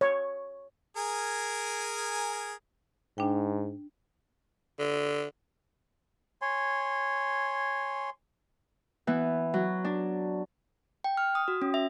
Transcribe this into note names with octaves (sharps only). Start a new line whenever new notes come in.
C#5
G#4 A#4 G#5
G#2 D4 G5
D3
C#5 G#5 C6
E3 B3
F#3
D4
G5
F6
D#6
F#4
C#4
E5